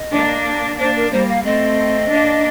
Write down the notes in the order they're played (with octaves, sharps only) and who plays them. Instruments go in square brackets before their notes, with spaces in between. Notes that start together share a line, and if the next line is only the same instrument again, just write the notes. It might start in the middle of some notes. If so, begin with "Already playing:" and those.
Already playing: [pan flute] D#5
[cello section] A#3 D4
[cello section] A#3 D4 [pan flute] C5
[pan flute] A#4
[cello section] G3 A#3 [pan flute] C5
[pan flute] F5
[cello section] A3 C4 [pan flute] D#5
[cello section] A#3 D4